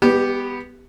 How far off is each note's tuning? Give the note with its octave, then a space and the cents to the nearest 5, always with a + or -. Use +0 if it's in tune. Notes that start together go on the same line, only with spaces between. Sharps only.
G#3 -40 B3 +0 G4 +0